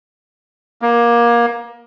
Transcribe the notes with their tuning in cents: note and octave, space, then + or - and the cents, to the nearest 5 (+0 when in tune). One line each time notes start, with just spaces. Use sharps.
A#3 +20